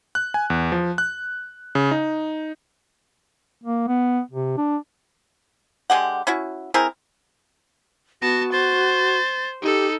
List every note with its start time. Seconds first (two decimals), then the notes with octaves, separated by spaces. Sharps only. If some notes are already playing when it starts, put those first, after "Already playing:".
0.15 F#6
0.34 G#5
0.50 E2
0.72 F3
0.98 F#6
1.75 C#3
1.91 D#4
3.63 A#3
3.88 B3
4.31 C3
4.57 D4
5.90 D3 G#3 G4 F#5
6.27 C#4 E4 F#4
6.74 C4 E4 G#4 A#4
8.22 B3 F#4 A5 A#6
8.52 C5 A6
9.62 D#4 G4 A4